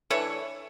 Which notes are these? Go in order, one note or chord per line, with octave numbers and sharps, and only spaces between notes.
E3 A3 D4 A4 C#5